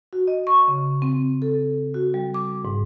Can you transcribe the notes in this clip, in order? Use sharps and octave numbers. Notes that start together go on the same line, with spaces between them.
F#4
D#5
C#6
C#3
C4
A4
F#4
G3
D6
G#2